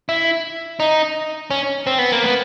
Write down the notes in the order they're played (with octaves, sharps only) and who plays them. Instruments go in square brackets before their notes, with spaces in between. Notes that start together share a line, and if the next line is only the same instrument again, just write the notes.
[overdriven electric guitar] E4
D#4
C#4
C4
B3
A#3
B3